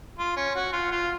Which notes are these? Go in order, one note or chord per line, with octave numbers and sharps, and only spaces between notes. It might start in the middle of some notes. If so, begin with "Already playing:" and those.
F4
C#4
F#4
F4
F4